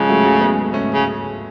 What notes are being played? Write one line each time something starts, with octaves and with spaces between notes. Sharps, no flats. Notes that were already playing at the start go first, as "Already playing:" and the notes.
Already playing: C#3 F3 G#3
F#3 A3
F#3 A3
G#3 B3
A3 C#4
C#3